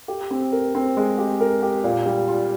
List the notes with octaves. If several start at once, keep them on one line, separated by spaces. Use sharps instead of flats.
G4
C4
A#4
C4
G#3
G4
A#4
G4
A#2
G3
F4